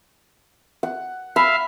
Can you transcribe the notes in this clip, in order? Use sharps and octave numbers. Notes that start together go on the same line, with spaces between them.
F#5
E5 F5 B5 F6